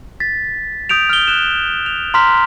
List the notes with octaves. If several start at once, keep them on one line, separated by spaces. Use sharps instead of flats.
A6 B6
D#6 G6 D7 F7
F6 G7
F#6 E7
F7
A#5 C6 F6 B6